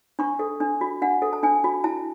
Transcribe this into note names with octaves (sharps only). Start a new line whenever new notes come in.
D4 C#6
A4
D4
F#4
D4 F#5
A4
A5
D4 G#5
F#4
E4 A5